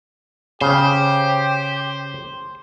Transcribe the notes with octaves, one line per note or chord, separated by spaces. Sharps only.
C#3 G4 C5